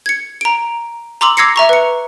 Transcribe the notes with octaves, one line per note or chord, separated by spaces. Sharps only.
G#6 C#7
A#5 D7
A#5 C6 D6 E6 F#7
D6 E6 G#6 A#6 C7 C#7
E5 A#5 C#6
B4 C#7